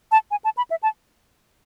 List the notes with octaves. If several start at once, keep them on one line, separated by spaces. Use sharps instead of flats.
A5
G#5
A5
B5
E5
A5